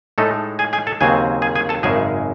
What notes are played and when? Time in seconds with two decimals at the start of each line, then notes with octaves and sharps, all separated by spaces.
0.18 A2 G#3 A3 D#4 A4
0.59 G#4 G#5
0.73 G#4 G#5
0.87 A4 A5
1.01 D#2 C#3 F#3 C4 G#4 G#5
1.42 G#4 G#5
1.55 G#4 G#5
1.69 A4 A5
1.83 G#1 F#2 C#3 G#3 G#4 G#5